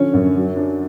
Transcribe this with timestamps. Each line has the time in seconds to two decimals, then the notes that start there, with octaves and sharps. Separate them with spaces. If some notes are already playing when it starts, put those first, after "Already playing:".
Already playing: D3 F3 C#4 C#5
0.14 F#2
0.35 F#3
0.57 D4